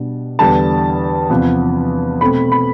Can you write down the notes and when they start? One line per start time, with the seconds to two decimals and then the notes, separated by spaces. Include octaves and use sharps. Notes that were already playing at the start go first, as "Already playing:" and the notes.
Already playing: B2 G3 D4
0.39 E2 D3 G3 D4 A5
1.30 E2 C3 F3 B3
2.21 B2 A3 C4 B5
2.52 B5